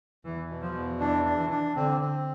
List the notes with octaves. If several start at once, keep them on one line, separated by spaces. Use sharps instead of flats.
E2 E3
B2
F3
E2
E3 D4
D4
E3
D4
D3 C4
C4